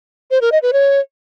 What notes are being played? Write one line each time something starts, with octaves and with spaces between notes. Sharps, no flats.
C5
A#4
D#5
B4
C#5